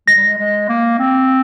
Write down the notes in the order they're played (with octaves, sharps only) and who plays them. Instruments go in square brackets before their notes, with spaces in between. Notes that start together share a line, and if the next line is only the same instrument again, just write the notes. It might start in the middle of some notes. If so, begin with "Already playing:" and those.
[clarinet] G#3 [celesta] A#6
[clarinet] G3
G#3
G#3
A#3
C4